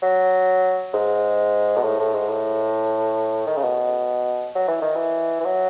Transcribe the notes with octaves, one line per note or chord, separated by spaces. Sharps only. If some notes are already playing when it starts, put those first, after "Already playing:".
F#3
G#2
B2
A2
A2
G#2
A2
D#3
C#3
B2
F#3
E3
D#3
E3
E3
F#3